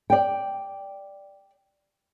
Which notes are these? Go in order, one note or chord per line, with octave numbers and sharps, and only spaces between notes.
D5 G5